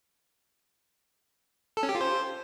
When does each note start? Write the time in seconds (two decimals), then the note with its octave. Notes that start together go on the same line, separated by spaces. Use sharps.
1.77 A4
1.83 C#4
1.89 G4
1.95 F4
2.01 C5